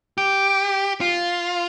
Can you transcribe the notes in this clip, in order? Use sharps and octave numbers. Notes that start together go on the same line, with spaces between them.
G4
F4